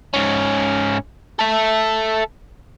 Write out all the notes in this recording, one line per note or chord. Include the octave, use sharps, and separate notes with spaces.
G#2 C#4
A4 E5